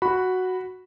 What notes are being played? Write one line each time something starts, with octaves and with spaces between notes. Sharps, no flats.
F#4 B5